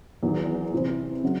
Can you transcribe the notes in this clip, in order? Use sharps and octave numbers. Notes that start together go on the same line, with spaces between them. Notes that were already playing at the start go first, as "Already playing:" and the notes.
E2 D#3 F#3
C3 E3 C4 E4
C#3 F#3